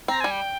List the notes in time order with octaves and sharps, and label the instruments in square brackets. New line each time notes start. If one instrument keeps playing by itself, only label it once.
[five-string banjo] C4 [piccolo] A#5
[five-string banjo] G3 [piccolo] G#5
[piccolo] G5